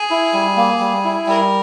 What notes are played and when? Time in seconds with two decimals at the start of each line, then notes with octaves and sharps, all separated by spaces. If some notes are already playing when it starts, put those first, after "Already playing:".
Already playing: G#4
0.10 E4
0.33 G3
0.57 A#3
0.80 G3
1.04 E4
1.27 G3 A#4